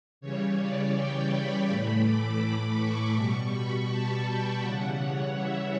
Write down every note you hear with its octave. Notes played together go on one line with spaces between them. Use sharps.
C#3 E3 G3 C#5
D5
G5
B5
A2 E3 A3
D6
C#6
B2 G3 C#6
B5
A5
G5
C#3 E3 G3 F#5
C#5
E5